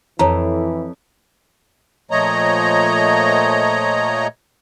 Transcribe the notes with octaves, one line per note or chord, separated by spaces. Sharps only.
F2 E3 E4 A4 C#5 A5 A#5
A#2 F3 A3 C#5 D#5 A#5